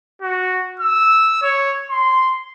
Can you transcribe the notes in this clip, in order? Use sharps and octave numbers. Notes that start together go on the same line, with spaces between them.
F#4
E6
C#5
C6